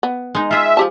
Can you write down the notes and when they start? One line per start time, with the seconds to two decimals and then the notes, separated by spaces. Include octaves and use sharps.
0.03 B3
0.35 G#3 D#4
0.51 F4 G#4 E5
0.77 F3 G4 A5